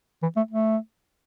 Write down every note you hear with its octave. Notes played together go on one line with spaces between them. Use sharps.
E3
A3
A3